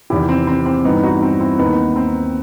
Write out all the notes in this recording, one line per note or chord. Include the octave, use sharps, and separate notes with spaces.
E2 C3 D#3 E4 G4
C4
C4
C4
G2 E3 B3 D#4
D#4 F#4
C4
C4 E4
D#2 D#3 B3 D#4
C4